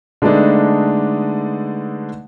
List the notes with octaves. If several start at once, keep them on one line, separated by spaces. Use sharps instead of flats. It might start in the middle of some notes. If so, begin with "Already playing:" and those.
D3 G#3 A3 B3 D4 D#4